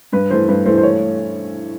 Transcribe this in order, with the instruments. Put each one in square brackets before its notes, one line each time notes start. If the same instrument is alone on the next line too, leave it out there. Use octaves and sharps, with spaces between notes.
[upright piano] G2 [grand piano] B4
[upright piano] E3 A3 [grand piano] C5
[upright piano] G2 [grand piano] B4
[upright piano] E3 A3 [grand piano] C5
[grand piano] C5
C#5